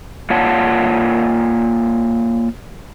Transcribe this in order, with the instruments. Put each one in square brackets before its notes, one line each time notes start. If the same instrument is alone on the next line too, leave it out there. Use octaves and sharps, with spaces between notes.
[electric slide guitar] A#3 F4 C#5 D5 F#5 A5